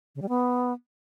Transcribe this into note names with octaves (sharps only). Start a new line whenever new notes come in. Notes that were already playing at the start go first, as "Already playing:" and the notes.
C#3
G3
B3